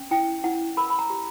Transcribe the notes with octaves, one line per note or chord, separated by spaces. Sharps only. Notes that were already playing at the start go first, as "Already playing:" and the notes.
Already playing: C#4
E4 G5
E4 F#5
A#4 B5
B5
A#5
G4